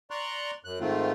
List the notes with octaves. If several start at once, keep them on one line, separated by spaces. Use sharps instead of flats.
D5 A#5 C6 C#6 F#6
F#2 F#6
G#2 D#3 A3 C4 F4